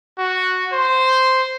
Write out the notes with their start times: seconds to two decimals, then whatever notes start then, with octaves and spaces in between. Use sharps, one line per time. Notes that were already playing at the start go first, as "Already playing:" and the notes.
0.18 F#4
0.73 C5